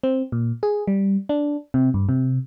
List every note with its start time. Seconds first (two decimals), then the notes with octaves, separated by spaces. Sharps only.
0.03 C4
0.32 A#2
0.63 G#4
0.87 G3
1.29 D4
1.74 C3
1.94 G2
2.09 C3